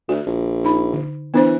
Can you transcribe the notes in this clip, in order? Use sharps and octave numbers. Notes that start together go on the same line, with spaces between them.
D2 F#4
A#1
D#4 B5
D3
E3 B3 D4 C5